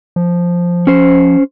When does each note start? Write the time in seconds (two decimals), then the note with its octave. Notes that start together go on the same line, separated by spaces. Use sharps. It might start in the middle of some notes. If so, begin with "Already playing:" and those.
0.16 F3
0.87 C#4 C5